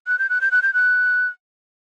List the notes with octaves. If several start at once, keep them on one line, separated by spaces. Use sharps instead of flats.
F#6
G6
F#6
G6
F#6
G6
F#6